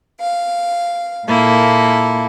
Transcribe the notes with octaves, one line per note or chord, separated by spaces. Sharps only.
F5
A#2 A#3 E4 A4